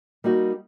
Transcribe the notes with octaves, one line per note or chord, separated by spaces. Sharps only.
G3 A#3 D#4 F#4